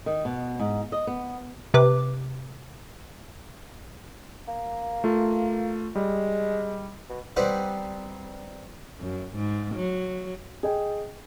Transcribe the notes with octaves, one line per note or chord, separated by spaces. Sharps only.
D#3
B2
G#2
D#5
B3
C3 B4 D6
A#3
A3 F4
G3 G#3
B2
G3 C4 D#4 B4 D5 F#5
F#2
G#2
F#3
G#4 D#5 G5